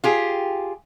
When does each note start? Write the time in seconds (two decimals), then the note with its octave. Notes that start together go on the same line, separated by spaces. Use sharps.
0.04 F4 G4 G#4